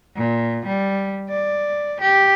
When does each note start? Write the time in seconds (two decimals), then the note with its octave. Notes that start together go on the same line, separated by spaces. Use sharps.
0.17 A#2
0.66 G3
1.29 D5
2.01 G4